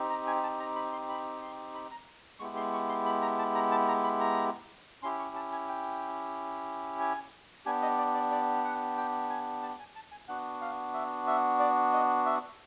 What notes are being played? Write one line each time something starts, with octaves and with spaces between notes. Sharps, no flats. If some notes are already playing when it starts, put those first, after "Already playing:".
Already playing: C4 D#4 G4
A#5
G#5
A5
A#5
B5
C6
B5
C6
B5
A#5
G#3 B3 E4 G4 C#6
C6
C#6
C6
B5
A#5
A5
A#5
A5
A#5
B5
A#5
C#4 E4 G4 C6
C#6
A5
G#5
G5
G#5
B3 D4 G4 G#5
D#5
D5
D5
D5
F#5
G5
G#5
A5
G#5
A5
G#5
B3 D4 F#4 F#5
F5
E5
E5
D5
D#5
E5